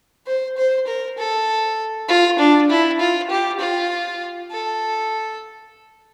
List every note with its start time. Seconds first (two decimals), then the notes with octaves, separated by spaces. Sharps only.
0.27 C5
0.57 C5
0.87 A#4
1.18 A4
2.09 F4
2.39 D4
2.70 E4
3.00 F4
3.30 G4
3.60 F4
4.51 A4